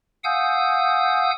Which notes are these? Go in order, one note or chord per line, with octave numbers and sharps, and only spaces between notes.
F5 F#5 G#5 D#6 E6 G6